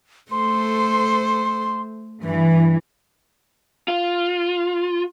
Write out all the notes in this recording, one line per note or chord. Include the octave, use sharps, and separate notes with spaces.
A3 A4 C5 C6
G2 E3
F4